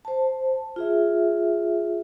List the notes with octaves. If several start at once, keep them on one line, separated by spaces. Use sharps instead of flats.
C5 A5
F4 G#4 E5